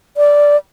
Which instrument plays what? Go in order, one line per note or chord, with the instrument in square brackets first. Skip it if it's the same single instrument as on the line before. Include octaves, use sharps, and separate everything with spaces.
[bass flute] D5